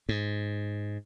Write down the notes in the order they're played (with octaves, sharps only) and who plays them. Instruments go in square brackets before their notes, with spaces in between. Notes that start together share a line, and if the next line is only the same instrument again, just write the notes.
[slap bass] G#2